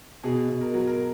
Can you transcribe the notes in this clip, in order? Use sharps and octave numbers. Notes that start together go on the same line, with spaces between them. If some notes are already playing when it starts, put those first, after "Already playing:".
B2 G#4
B2
A#4
F#3
A#4